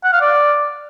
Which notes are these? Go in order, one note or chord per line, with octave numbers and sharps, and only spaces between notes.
F#5
F5
D5